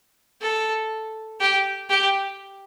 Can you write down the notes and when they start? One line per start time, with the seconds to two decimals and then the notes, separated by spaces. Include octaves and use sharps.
0.41 A4
1.41 G4
1.90 G4